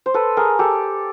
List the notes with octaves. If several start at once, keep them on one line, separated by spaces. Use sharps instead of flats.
C5
A4 B4
G#4 A#4
G4 A4